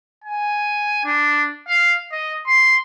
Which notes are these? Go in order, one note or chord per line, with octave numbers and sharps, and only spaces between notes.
G#5
D4
F5
D#5
C6